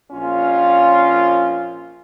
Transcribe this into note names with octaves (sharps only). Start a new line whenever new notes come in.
A#1 C#4 F4